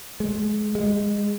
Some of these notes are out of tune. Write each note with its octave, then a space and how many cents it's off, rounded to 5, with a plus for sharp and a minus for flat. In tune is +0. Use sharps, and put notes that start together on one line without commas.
G#3 +25
G#3 -20